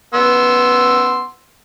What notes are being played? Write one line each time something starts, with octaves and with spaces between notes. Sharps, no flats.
B3 C6 E6